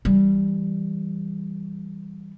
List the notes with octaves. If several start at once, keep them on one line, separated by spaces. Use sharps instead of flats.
E3 G3